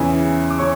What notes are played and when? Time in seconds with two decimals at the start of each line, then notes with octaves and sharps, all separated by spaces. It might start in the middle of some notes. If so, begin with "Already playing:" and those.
Already playing: E2 C#3 E3 E4 E5
0.50 D6
0.59 C#3 C#5 C#6